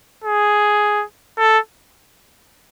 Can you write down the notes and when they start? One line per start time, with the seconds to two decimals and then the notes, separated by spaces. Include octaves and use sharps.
0.24 G#4
1.38 A4